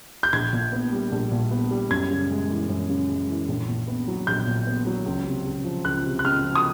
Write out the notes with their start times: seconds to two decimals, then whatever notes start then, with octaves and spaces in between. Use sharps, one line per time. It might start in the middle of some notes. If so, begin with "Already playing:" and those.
0.23 G6
0.33 A#1 G#6
0.53 A#2
0.73 B3
0.92 G3
1.12 A#1
1.31 A#2
1.51 B3
1.71 G3
1.91 F#2 G#6
2.11 C#3
2.31 G#3
2.50 E3
2.69 F#2
2.89 C#3
3.09 G#3
3.29 E3
3.48 A#1
3.68 A#2
3.88 B3
4.08 F#3
4.27 A#1 G6
4.47 A#2
4.67 B3
4.87 F#3
5.06 C#2
5.26 C3
5.46 C#2
5.65 F3
5.85 C#2 F#6
6.04 C3
6.19 F#6
6.24 C#2 F6
6.44 F3
6.55 D#6